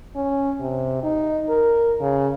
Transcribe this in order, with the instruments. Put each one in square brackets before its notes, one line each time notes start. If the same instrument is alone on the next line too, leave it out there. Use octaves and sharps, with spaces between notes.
[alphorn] C#4
C3
D#4
A#4
C#3